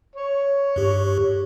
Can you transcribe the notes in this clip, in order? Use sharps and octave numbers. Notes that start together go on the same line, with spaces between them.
C#5
G2 G4